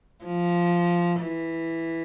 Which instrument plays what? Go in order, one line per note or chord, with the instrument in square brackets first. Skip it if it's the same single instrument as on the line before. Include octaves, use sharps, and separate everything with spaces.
[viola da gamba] F3
E3